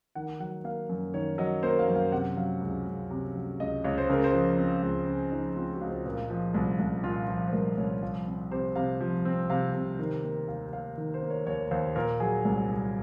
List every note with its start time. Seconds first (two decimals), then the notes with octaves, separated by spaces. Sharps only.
0.15 D#3 F#5
0.40 F#3 F#5
0.64 A#3 F5
0.89 F#2
1.14 D#3 C#5
1.38 F#3 D#5
1.63 A#3 C5
1.79 F5
1.88 F#2
1.96 F5
2.12 C3 F#5
2.37 F#3 F5
2.61 C#2
2.86 C#2
3.11 C3
3.36 F#3
3.60 C#2 D#5
3.84 C#2 C#5
3.98 C5
4.09 C#3 A#4
4.24 C5
4.33 F3
4.58 C4
4.83 C#2
5.08 C#3 G#4
5.32 F3 D#4
5.56 C4 F4
5.73 F#4
5.81 C#2
5.90 C5
6.06 A#2 A#4
6.30 F3
6.54 C2
6.79 C2
7.04 A#2 F4
7.28 F3
7.48 C5
7.53 C2 A#4
7.78 C2 C#5
8.02 F3 F5
8.27 C4
8.51 C3 C5
8.75 C3 F5
9.01 F3
9.25 C4
9.50 C3 F5
9.74 C3
9.99 D#3
10.24 A#3
10.48 D#2 F5
10.73 D#2 F5
10.97 D#3
11.14 C5
11.22 A#3
11.30 C#5
11.46 D#2 C#5
11.71 D#2 C5
11.96 A#2 A#4
12.20 F#3 G#4
12.45 C2
12.69 C2